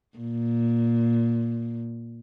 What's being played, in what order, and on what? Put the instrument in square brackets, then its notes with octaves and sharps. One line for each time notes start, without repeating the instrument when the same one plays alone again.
[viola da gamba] A#2